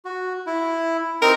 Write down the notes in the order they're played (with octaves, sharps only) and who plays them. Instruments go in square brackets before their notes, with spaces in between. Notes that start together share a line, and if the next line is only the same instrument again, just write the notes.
[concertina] F#4
E4
[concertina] C4 D#4 [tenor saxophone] A#4